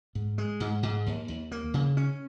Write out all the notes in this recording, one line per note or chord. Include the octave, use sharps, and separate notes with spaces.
G#2
G#3
G#2
G#2
D#2
D#2
A#3
C#3
C#4